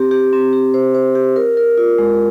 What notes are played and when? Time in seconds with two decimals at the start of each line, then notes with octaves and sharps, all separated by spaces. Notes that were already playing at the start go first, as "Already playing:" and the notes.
Already playing: C4 G4
0.11 G4
0.33 C4
0.53 G4
0.74 C5
0.95 C5
1.15 G4
1.36 A#4
1.57 A#4
1.78 F4
1.98 G#3